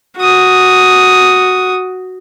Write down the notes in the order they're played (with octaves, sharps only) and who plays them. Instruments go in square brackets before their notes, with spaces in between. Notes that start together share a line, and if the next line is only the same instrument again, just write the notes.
[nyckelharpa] F#4 D#6